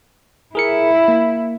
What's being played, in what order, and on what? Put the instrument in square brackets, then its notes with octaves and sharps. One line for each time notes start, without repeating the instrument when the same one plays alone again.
[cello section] E4 [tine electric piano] G#4 A#4 C#7
[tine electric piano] A#3